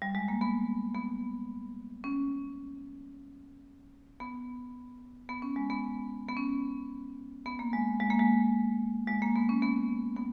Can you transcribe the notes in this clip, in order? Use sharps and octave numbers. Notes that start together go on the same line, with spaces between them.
G3
G#3
A#3
B3
B3
C#4
B3
B3
C#4
G#3
B3
B3
C#4
B3
A#3
G#3
G#3
A#3
G#3
G#3
A#3
B3
C#4
B3
B3